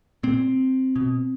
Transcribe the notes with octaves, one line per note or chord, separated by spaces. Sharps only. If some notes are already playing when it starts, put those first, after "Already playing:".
A#2 C4
B2